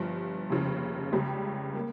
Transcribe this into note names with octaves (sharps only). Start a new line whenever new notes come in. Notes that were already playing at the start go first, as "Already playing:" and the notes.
Already playing: G1 G2 F3
F1 D#2 C#3 F3
C#2 C#3 G3
A#3